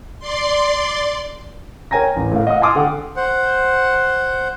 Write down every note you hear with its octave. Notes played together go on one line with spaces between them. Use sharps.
D5 C6
A#4 C#5 G5 G#5 A#5 A#6
A1
A2 A#4 F5
D#5 F5 F#5 D#6
G#5 A5 C6 D6 D#6 F6
D3 A4 F#5 G5
C5 F#5